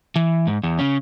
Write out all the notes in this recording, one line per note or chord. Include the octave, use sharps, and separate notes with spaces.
E3
G#2
E2
C#3 C#4